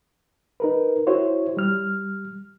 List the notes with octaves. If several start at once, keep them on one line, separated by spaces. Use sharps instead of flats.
D#4 A#4 B4
E4 F#4 C5 C#5
G3 F6